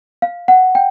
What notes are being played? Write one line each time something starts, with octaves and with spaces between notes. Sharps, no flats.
F5
F#5
G5